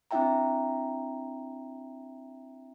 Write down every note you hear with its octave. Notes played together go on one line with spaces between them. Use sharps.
C4 D4 E4 E5 G5 A#5